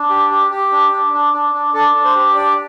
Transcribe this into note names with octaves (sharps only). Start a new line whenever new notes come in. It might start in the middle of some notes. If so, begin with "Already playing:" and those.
Already playing: D4
G4
G4
G4
D4
D4
D4
D4
D4
D4 A4
D4
C5
G4
D4 D5